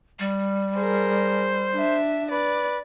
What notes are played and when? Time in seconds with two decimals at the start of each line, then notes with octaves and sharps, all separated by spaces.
0.19 G3
0.77 G#4 A#4 C5
1.74 D4 E5
2.31 B4 D5